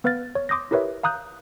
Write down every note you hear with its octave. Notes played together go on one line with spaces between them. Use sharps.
B3 B4 F5 F6 A6
C#5
C6 D6 D#6 G6 A#6
E4 G4 A#4 B4 C#5 E5
F5 A#5 D#6 F#6 G6